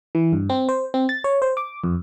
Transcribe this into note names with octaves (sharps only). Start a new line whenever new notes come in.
E3
G2
C4
C5
C4
A6
C#5
C5
D6
F2